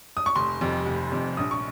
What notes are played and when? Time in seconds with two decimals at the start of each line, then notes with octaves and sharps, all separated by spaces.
0.17 D#6
0.26 C#6
0.36 F1 C6
0.61 F2 C3
0.86 F1
1.12 F2 C3
1.37 A#1 D#6
1.51 C#6